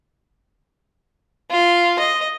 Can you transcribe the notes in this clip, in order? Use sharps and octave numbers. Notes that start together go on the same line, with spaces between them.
F4
D#5